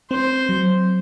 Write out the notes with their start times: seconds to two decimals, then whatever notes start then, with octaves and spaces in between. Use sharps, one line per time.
0.11 C4 C5
0.49 F#3